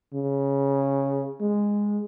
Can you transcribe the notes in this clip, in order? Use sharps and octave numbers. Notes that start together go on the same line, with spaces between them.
C#3
G#3